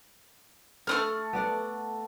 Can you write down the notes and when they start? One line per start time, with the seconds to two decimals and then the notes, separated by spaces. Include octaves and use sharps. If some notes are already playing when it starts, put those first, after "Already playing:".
0.87 A3 C4 A4 F6
1.33 B3 D5 F#5